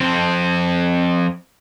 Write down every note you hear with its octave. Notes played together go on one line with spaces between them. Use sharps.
F2 C4